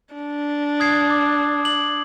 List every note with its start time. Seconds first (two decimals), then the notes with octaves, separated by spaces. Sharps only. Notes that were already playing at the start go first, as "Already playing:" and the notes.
0.14 D4
0.80 D#6 G#6 C7
1.10 D6
1.63 D6 F#7